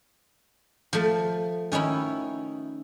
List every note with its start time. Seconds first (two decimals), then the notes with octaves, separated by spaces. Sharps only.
0.93 F3 A3
1.72 D#3 C#4 D#4 E4